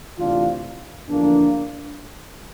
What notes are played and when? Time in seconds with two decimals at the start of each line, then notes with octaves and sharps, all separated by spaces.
0.18 D2 C3 E3 D4 F4
1.09 E2 D3 F3 A#3 D4